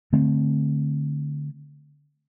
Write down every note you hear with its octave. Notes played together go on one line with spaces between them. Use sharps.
D3 A3 C4